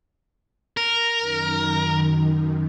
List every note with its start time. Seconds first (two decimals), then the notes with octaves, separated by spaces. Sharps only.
0.77 A#4
1.18 F#2 D#3